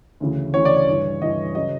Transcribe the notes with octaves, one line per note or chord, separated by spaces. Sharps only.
D2 C#3 E3
D2 C#3 E3 C#5
D5
C#5
G2 E3
G2 E3 D#5
C#3 F#3 D#5